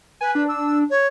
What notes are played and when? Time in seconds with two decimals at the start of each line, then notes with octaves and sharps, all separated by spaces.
0.21 B4 G#5
0.35 D4
0.48 E6
0.89 C#5